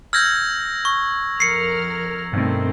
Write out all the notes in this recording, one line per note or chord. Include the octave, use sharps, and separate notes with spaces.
E6 F6 G6 G#6 A#6
C#6
F2 A#4 F6 C7 C#7
G2 B2 D#3 A3 C4